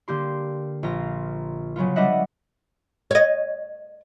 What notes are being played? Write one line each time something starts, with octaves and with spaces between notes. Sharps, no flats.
D3 A#3 G4 C6
A#1 F4 A#5
C#3 F#3 B3 F4
G3 D4 B4 D#5 E5 F#5
C#5 D#5